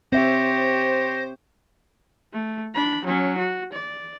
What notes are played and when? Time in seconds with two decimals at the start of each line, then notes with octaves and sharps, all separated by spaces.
0.12 C4 G4 C5 C#5 E5 A#6
2.33 A3
2.75 D4 B5
3.05 F#3 C#4
3.38 F#4
3.73 D5